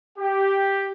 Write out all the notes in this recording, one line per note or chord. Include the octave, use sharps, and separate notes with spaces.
G4